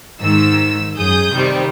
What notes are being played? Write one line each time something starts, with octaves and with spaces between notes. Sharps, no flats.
G#2 D#3 E6
F#2 G#4 D#6 G6
C3 D#3 G3